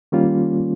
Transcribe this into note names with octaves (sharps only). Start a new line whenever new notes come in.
D#3 G3 A#3 C#4 F4